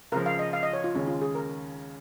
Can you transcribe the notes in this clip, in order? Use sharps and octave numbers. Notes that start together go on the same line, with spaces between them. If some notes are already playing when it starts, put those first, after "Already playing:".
C#2 C#3 F3 A#4
F5
D#5
F5
D#5
C#5
F4
D#2 C#3 G#3 C#4
F4
G#4
A#4